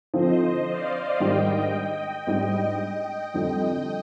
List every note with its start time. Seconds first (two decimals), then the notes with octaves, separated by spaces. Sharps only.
0.14 D3 F3 C4 C5 D#5
0.67 D5 F5
1.20 G#2 D#3 G3 D4 G4 D#5 G5
2.27 G#2 G3 D4
2.80 D#5 G5
3.33 F2 D3 G3 D#5 G5